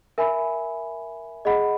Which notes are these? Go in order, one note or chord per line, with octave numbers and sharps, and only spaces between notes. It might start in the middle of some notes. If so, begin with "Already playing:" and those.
A#4 E5 G#5 B5
G#4 D#5 F#5 B5